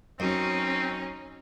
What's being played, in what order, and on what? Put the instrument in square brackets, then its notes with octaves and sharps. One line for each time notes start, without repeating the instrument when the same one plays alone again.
[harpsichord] F#2 [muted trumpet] C4 [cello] C#4 [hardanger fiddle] D#4